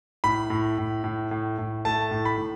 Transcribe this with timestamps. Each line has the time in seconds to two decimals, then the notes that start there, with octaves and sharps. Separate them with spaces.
0.24 A2 B5
0.50 A2
0.78 A2
1.04 A2
1.31 A2
1.58 A2
1.85 A3 A5
2.11 A2
2.25 B5
2.38 A2